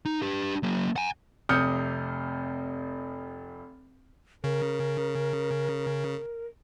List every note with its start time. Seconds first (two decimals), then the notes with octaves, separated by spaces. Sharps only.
0.05 D#4
0.22 D4 G4
0.63 F#3 A#3
0.96 F#5 G#5
1.49 F1 C3 D#6 F6 G6 C#7
4.44 C#3 A#4